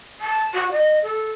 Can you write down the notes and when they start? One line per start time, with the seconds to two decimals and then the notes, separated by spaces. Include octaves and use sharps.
0.21 A5
0.54 F#4
0.72 D#5
1.03 A4